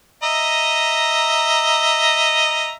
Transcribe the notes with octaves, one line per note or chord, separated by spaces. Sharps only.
D#5 E5 A#5